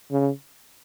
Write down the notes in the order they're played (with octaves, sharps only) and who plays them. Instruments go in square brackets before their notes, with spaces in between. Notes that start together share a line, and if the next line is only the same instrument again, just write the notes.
[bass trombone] C#3